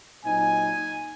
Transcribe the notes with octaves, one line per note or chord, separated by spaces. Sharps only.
A#2 F#3 C4 D#4 G#5